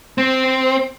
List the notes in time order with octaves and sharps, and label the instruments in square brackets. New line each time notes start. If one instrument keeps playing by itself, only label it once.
[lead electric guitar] C4